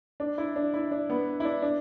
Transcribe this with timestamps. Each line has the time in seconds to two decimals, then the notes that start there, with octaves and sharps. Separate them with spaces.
0.20 D4
0.38 E4
0.56 D4
0.74 E4
0.91 D4
1.10 B3
1.40 E4
1.45 D4
1.62 D4